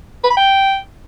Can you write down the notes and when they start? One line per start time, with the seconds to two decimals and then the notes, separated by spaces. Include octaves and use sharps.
0.24 B4
0.30 B5
0.37 G5